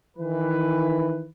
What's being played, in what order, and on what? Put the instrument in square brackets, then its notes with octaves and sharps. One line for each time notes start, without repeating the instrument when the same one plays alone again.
[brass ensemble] D#3 E3 B4